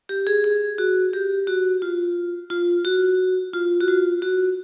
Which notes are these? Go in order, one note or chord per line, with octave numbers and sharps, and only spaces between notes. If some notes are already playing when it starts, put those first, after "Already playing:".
G4
G#4
G#4
F#4
G4
F#4
F4
F4
F#4
F4
F#4
F4
F#4